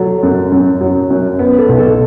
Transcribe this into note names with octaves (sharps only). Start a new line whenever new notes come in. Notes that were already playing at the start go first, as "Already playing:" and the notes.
Already playing: F#3 A3
F#2
F#2
F#3
F#2
B3
A4
B1
A4